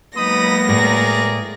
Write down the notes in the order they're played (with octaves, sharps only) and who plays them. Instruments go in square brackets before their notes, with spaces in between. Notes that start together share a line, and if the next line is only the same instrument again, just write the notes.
[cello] F#3 A#3 [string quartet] G#3 B3 A#6 [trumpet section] D#4 B5 D#6
[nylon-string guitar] A2 [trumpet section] G#4 A#4 D5